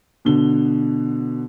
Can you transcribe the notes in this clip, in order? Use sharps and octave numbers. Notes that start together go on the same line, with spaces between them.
B2 D3 G7